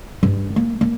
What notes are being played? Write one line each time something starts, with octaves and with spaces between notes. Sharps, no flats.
G2
A#3
A#3